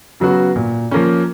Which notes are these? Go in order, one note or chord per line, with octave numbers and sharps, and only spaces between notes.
C#3 F#3 B3 F#4
A#2
F3 A#3 C#4